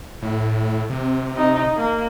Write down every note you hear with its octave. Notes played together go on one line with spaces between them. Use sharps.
A2
C3
D#4
A#3